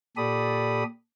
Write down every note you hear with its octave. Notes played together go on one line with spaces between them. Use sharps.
A#2 G4 A4 D5 B5 D#6